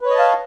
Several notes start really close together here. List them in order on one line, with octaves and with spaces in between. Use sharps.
B4 C#5 D#5 A5 F5